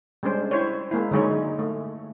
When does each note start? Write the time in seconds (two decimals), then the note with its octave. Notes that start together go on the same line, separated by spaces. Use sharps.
0.23 G3 G#3 C#4 D4 C5
0.51 E4 C5 C#5
0.91 G#3 A#3 E4
1.11 D3 F#3 G#3 D#4 C#5
1.59 A3